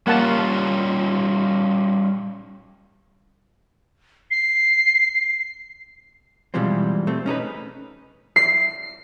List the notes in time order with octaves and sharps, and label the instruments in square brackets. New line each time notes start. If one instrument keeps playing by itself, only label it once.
[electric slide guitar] G3 C#4 F4 [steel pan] A#3 F#5 A5
[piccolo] C7
[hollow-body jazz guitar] B2 E3 F3 G3 G#3 C4
A3 C4
C#4 D#4 A4 B4
[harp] C7